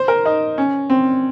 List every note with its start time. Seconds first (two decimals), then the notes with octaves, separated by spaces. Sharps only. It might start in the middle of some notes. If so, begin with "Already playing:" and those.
Already playing: C5
0.08 A#4
0.25 D#4
0.58 C#4
0.90 C4